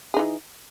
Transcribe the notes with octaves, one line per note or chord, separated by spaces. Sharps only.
E3 D#4 G#4